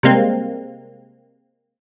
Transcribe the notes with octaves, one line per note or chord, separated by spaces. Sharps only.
C3 G3 G#3 A#3 C4